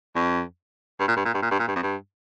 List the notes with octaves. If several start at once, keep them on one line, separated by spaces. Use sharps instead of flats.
F2
G2
A#2
G2
A#2
G2
A#2
G2
A#2
G2
F2
G2